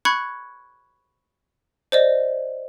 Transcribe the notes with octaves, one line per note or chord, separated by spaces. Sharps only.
B5 C#6 F#6 G#6 C#7
C5 D5 D#5